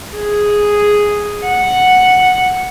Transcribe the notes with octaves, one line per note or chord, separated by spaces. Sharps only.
G#4
F#5